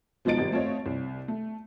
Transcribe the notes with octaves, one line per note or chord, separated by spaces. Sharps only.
B2 F3 G#3 D#4 A6 D7
G#1 G3
A3 C4 F4 C#5 D#5
C2
A3